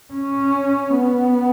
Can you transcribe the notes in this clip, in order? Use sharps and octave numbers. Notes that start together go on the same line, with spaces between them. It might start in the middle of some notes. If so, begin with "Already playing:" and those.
C#4
B3